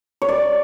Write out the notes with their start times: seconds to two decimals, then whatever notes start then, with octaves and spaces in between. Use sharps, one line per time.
0.22 C#5
0.29 D5